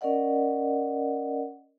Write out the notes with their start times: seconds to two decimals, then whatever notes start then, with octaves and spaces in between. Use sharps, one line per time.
0.01 C#4 A#4 D5 D#5 F#5